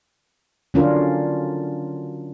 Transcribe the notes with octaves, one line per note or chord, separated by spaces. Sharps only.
D3 F#3 C#4 D4 F4 A#4